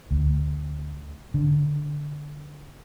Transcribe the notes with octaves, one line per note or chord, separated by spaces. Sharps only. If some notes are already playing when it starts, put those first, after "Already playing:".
D2
D3